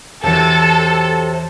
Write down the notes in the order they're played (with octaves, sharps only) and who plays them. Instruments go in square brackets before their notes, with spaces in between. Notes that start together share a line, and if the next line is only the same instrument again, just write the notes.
[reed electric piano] E2 E3 [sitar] C3 F#3 [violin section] A4